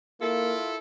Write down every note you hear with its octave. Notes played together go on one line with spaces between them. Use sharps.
A#3 E4 F4 A4